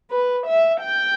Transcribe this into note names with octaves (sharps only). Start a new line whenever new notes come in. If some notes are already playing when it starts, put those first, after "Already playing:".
B4
E5
G5